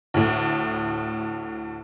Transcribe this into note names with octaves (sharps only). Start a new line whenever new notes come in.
D2 A2